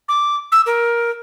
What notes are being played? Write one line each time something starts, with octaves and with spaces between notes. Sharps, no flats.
D6
E6
A#4